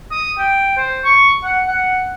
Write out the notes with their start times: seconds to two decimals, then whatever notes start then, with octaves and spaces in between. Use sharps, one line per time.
0.11 D#6
0.38 G5
0.77 C5
1.04 C#6
1.44 F#5
1.68 F#5